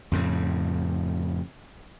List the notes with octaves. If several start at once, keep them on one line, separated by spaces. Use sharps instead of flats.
F2 A2 C#3